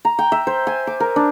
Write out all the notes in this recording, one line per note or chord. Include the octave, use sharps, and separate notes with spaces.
A#5
G5
E5
C5
G#5
D6
A#4
D4